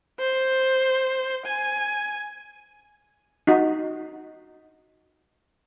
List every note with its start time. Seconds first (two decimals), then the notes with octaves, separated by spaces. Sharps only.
0.19 C5
1.45 G#5
3.47 D#4 F#4